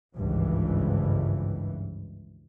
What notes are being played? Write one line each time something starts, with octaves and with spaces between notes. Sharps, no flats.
G#1 C#2 G2 E3